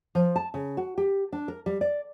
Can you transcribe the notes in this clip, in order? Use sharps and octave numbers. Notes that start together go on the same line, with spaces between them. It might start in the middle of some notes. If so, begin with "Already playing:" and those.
F3
A5
C#3
F#4
G4
D4
A#4
G3
D5